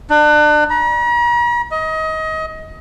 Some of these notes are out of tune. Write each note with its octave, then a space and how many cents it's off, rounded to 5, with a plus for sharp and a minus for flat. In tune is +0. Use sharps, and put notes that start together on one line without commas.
D4 +35
A#5 +45
D#5 +25